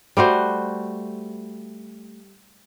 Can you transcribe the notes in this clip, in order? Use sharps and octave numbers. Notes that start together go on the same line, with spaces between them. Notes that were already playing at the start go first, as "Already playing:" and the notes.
G3 A3 F#4 C5